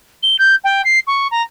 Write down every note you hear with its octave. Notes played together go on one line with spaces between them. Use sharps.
G7
G6
G5
C7
C#6
A#5